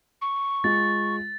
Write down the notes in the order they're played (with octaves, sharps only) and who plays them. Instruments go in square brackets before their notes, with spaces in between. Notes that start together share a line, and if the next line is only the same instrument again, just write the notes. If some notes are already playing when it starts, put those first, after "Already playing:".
[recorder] C#6
[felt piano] G#3 F4 [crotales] A6